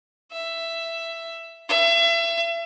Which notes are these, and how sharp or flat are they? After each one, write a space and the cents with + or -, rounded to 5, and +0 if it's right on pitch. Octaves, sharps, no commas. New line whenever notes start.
E5 +10
E5 +35